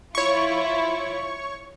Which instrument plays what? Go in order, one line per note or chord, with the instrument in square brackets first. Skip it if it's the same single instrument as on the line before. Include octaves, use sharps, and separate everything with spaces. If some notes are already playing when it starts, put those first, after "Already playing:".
[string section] F3 E4 F4 [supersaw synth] C#5 C#6